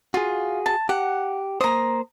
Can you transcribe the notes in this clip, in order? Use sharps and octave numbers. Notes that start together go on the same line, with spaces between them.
F4 F#4 G#4
A5
G4 F#5
A#3 C5 A#5 D#6